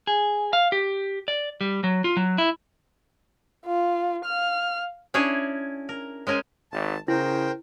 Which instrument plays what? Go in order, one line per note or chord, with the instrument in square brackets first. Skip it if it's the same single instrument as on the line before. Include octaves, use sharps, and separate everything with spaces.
[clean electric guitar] G#4
F5
G4
D5
G3
F#3
F4
F#3
E4
[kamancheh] F4
F5 F6
[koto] C#4 D4 E4 G#4 C#5 D5
A#4
G#3 C#4 A#4 C5 G#5
[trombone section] G#1 [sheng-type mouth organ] A5
[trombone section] C#3 [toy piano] E4 [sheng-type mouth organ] A#4 C5 G5